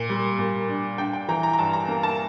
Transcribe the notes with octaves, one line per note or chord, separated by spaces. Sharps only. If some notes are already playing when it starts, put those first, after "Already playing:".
Already playing: A#2
G3
A#2
D4
D4 G5
G5
E3 A#5
A#5
A#5
G2 A5
A#5
A#3
A5